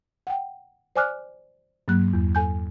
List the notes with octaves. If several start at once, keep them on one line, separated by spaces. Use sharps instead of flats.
F#5 G5
C5 D5 G#5 D6 F6 F#6
G2 F#3 A#3 F#6
E2
A4 G#5 G6